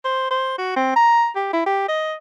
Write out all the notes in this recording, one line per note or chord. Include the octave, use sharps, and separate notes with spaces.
C5
C5
F#4
C4
A#5
G4
E4
G4
D#5